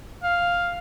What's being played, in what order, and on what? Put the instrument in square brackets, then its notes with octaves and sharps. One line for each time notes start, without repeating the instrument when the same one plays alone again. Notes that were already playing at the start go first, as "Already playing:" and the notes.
[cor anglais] F5